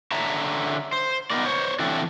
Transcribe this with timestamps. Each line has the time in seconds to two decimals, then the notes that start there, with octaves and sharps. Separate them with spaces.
0.12 D3 C#5 E5 A5 A#5
0.93 C5
1.30 B3 C4 D#4 A#4 D5
1.45 C5 C#5
1.80 D3 E3 A3 C4 D4 A4